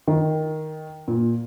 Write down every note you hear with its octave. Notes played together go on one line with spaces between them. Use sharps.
D#3
A#2